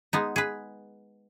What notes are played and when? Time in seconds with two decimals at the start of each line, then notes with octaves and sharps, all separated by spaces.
0.13 G#3 B3 D#4
0.36 G#4 B4